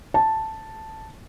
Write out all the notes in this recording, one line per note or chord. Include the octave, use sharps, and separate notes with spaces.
A5